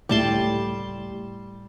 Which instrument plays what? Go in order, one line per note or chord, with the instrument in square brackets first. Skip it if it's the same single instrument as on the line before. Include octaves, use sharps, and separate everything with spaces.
[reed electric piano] C#2 A2 G4 [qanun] G3 A5 C6